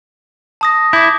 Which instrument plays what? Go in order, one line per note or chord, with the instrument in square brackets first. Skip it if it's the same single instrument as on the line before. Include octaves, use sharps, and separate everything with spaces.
[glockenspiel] A5 D#6 A#6
[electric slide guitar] E4 [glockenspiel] D6 G6